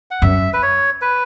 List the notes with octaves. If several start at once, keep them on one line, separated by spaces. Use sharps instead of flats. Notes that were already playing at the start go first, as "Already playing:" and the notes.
F#5
F#2 E5
B4
C#5
B4